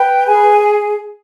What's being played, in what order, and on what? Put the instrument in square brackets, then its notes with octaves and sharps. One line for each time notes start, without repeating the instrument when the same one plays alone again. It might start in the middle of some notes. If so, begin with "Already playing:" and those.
Already playing: [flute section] B4 G5
G#4 G#5